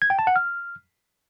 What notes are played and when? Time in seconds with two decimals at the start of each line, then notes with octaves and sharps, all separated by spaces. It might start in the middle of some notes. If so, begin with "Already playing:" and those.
0.02 G#6
0.10 G5
0.19 A5
0.27 F#5
0.36 F6